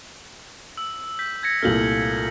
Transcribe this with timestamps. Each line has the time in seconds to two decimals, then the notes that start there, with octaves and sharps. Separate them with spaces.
0.77 E6
1.19 G6 B6
1.43 G#6 A#6 C#7
1.62 C2 A#2 A3 F6 G6 F#7